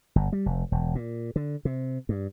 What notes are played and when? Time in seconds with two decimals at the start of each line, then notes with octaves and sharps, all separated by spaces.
0.16 G1
0.33 G3
0.46 F1
0.72 E1
0.95 A#2
1.36 D3
1.65 C3
2.09 G2